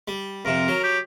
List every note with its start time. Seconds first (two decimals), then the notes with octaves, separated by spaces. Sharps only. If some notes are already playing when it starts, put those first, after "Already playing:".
0.08 G3
0.45 F2 C3 A#4
0.68 F#3
0.83 G4